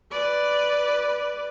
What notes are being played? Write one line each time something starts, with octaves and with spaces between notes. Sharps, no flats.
B4 D5